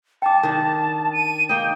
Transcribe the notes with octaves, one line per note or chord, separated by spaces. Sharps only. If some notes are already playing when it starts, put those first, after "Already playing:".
G5 A5 D6
D#3 D4
D#7
A#3 D#4 G5